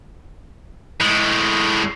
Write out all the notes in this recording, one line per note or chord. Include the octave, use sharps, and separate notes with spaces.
A2 G#3